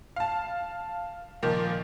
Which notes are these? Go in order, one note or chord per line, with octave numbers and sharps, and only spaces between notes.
F5 A5
A#2 D#3 F3 A#3